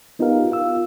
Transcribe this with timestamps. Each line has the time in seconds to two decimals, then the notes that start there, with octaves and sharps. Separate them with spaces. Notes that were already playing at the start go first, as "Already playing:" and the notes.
0.19 B3 D#4 F4 G4 A#4 F5
0.50 F4 F5 E6